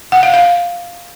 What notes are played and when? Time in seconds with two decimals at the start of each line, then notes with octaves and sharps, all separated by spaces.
0.12 F#5
0.23 F5
0.34 F5